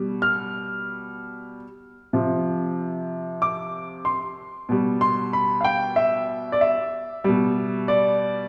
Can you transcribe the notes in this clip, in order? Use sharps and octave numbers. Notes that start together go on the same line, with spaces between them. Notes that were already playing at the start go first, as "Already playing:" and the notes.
Already playing: B2 G3
F6
C3 F3
D6
C6
B2 G3
C6
B5
F5
G5
E5
D5
E5
B2 G3
D5